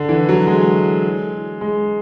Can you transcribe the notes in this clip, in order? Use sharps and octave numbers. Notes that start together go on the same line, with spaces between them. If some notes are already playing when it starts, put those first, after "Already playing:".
Already playing: D3
E3
F#3
G#3
G#3